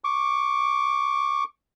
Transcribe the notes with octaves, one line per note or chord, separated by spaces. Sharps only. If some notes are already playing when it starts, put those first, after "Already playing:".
C#6 D6